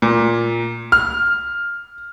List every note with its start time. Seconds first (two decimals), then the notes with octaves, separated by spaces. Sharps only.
0.02 A#2
0.92 F6